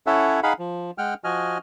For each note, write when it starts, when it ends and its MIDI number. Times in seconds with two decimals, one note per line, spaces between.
0.07 0.40 61
0.07 0.40 64
0.07 0.40 69
0.07 0.40 73
0.07 0.40 76
0.07 0.40 78
0.43 0.53 63
0.43 0.53 68
0.43 0.53 77
0.43 0.53 78
0.43 0.53 83
0.59 0.91 53
0.98 1.14 56
0.98 1.14 78
0.98 1.14 79
0.98 1.14 89
1.24 1.58 53
1.24 1.58 66
1.24 1.58 75
1.24 1.58 80
1.24 1.58 89